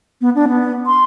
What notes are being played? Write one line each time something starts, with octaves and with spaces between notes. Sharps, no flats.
B3
D4
B3
C6